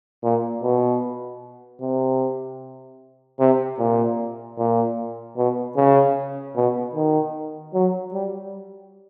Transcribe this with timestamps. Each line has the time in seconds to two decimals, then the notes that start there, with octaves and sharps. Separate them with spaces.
0.23 A#2
0.63 B2
1.81 C3
3.39 C3
3.79 A#2
4.58 A#2
5.37 B2
5.76 C#3
6.56 B2
6.95 D#3
7.74 F#3
8.14 G3